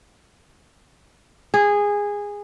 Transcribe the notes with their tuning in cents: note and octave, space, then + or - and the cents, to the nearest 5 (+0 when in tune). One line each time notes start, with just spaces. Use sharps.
G#4 -15